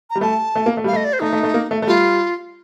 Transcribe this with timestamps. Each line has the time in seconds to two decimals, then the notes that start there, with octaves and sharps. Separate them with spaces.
0.10 A#5
0.15 G3
0.21 A3 A5
0.55 A3
0.66 A#3
0.77 A3
0.84 G3
0.88 F5
0.93 A3 D#5
1.05 D5
1.13 C5
1.21 A3 D#4
1.33 A3
1.43 A3
1.54 A#3
1.71 A3
1.82 A3
1.87 G3 F4